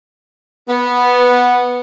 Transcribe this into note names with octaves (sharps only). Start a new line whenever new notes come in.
B3